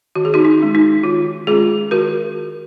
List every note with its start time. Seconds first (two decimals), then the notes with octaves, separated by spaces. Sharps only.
0.15 D#3 F#4
0.25 G#4
0.34 D#4 F#4
0.45 D#4
0.59 G#3 C#4
0.75 D#4
1.03 D#3 F4
1.47 G#3 C#4 F4 G#4
1.91 D#3 F#4 A#4